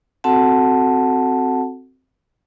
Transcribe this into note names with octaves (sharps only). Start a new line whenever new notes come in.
C4 F#4 A4 F#5 A5